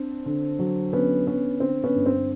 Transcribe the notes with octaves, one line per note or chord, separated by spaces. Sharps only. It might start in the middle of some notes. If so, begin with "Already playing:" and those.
Already playing: C4 D4
D3
F#3
D3 B3 C#4
D3 B3 C#4
D3 C4
B3 C#4
G2
C4